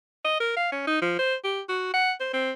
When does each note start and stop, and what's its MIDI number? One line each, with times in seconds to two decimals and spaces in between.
0.24 0.36 75
0.40 0.52 70
0.57 0.68 77
0.72 0.84 61
0.87 0.99 63
1.02 1.14 53
1.19 1.35 72
1.44 1.61 67
1.69 1.90 66
1.94 2.12 78
2.20 2.31 72
2.33 2.52 60